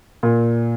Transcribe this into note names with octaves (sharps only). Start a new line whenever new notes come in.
A#2